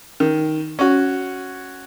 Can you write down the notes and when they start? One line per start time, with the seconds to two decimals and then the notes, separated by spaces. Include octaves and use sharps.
0.20 D#3
0.79 C#4 F#4